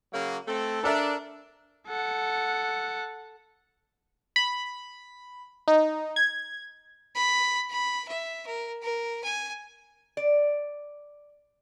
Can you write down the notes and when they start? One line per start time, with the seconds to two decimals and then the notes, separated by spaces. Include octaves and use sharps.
0.13 C#3 F#3 A#3
0.47 A3 C4 A4
0.84 D4 A4 A#4 E5
1.88 A4 F#5
4.36 B5
5.68 D#4
6.16 G#6
7.15 B5
7.70 B5
8.08 E5
8.47 A#4
8.82 A#4
9.24 G#5
10.17 D5